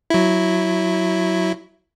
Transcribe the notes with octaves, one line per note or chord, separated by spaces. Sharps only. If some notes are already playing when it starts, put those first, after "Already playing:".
F#3 E4